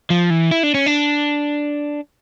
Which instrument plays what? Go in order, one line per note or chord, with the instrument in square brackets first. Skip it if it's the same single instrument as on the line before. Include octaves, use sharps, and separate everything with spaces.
[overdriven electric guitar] F3
E3
E4
D4
C#4
D4